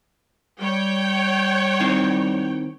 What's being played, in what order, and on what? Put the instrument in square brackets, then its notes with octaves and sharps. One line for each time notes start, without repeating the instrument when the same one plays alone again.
[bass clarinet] G3 [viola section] C#5 G5
[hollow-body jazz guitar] D#3 C4 E4